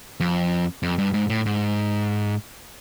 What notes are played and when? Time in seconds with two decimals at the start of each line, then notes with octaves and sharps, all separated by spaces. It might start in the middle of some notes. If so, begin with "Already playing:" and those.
0.20 F2
0.83 F2
0.98 G2
1.14 G#2
1.30 A2
1.46 G#2